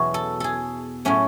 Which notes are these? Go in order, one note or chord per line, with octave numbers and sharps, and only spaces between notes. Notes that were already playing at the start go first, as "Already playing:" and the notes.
Already playing: E2 B2 F#3 F#4
A4
G#4 A4
A2 F#3 A3 C#4